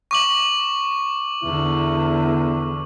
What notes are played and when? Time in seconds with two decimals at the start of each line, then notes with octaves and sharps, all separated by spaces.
0.11 C#6 D6 F#7
1.44 E2 D3 B3 E4